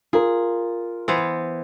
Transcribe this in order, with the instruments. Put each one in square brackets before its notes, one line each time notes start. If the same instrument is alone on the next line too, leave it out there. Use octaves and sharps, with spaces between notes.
[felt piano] F4 A#4 [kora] G#4
[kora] E3 B3 C5